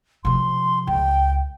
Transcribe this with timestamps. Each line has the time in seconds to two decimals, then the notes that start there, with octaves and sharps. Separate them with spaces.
0.25 C3 F3 C6
0.87 C#2 G5